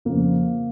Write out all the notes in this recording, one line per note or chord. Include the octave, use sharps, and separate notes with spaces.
F2 C#3 F3 A#3